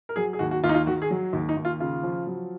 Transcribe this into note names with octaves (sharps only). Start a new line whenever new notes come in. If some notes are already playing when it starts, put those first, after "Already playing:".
A#4
F#3 G#4
G#4
D#2 F#4
F#4
D#2 F4
D#4
F4
D#3 F#4
G#4
F#3
D#2
D#4
D#2
F4
C#3 F4
F3
F#3